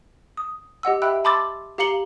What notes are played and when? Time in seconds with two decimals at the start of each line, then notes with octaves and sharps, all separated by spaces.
0.37 D#6
0.83 G4 D#5 F#5 E6
1.02 G4 E5 G5 B5 E6 F#6
1.24 A5 B5 C6 D6 E6 A6
1.78 G4 F5 A#5 C#7 F#7 G7